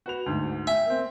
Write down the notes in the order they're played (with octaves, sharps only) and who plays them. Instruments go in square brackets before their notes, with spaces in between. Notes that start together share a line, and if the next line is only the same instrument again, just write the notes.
[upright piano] F#4 B4 F7
D2 G#2
[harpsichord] E5 [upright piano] G5 G#5
[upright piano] A#3 C4